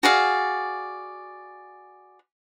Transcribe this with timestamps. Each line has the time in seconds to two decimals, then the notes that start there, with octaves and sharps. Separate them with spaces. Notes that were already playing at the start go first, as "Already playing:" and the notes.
0.03 F#4 G#4 D5 F5